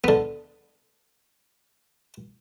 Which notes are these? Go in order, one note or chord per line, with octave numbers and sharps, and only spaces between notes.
D3 B3